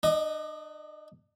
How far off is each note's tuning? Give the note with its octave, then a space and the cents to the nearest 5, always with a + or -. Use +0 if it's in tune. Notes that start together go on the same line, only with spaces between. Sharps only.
D4 +40 D#5 +0